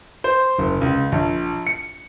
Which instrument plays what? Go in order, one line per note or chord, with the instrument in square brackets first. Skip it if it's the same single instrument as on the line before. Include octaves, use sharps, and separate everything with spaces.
[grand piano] C5
F#1
C#2
A#1
C#7